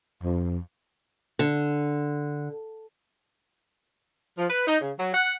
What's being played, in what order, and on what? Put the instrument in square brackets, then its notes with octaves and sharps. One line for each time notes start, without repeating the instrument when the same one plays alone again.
[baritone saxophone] F2
[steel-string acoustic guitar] D3
[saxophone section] F3
B4
D#4
C#3
F#3
F#5